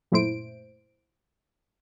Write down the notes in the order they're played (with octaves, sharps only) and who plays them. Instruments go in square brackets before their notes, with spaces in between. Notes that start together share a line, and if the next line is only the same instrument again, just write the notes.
[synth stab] F#2 A#2 A3 E4 C5 D7